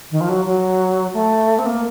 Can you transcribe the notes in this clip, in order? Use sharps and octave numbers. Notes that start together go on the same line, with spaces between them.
D#3
F3
F#3
F#3
A3
C4
A#3